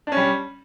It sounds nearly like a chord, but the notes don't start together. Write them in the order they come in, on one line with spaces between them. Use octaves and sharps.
D4 C#4 G3